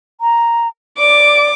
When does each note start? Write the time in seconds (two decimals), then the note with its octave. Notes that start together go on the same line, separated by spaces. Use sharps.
0.21 A#5
0.98 D5 D6